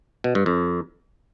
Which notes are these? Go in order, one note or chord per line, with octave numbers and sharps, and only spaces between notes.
B2
G2
F2